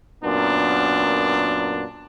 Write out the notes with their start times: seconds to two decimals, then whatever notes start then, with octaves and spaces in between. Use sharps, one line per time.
0.24 F#2 A#2 B3 D4